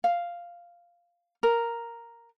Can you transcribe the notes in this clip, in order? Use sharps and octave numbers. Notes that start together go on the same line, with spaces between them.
F5
A#4